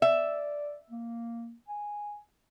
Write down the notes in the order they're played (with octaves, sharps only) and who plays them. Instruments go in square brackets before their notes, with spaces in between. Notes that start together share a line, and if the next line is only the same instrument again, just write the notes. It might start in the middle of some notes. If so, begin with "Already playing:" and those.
[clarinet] D5 [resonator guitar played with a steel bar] E5
[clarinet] A#3
G#5